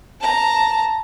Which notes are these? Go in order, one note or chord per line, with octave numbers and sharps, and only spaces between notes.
A5 A#5